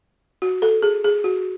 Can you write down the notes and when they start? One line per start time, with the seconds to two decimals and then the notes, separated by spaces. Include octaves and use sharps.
0.42 F#4
0.62 A4
0.82 G#4
1.04 G#4
1.24 F#4